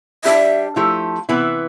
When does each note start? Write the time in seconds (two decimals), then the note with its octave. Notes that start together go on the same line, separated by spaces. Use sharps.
0.24 G3 D4 G4 E5
0.76 F3 A3 E4 G4
1.29 C3 E3 B3 E4